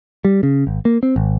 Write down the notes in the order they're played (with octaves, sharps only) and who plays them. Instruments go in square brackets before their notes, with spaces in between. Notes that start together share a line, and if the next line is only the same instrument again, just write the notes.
[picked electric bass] G3
C#3
G#1
A#3
C4
G#1